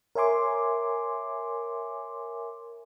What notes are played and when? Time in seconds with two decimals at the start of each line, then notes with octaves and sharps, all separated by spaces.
0.15 A#4 C#5 E5 G#5 C6 D6